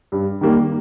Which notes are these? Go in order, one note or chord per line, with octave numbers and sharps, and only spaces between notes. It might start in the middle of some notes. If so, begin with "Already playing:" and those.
G2
D#3 G3 A#3